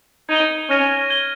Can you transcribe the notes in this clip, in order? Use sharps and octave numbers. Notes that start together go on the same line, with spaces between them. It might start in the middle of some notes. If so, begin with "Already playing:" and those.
D#4 G#6 D#7 G7
C#4 F6 A#6 D#7
G#6 D#7 G7